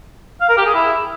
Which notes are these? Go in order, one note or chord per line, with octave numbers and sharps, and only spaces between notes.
F5
A#4
G4
G#4
E4